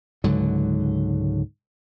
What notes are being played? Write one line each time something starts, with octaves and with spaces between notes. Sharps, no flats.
C#2 G#2 D3 F#3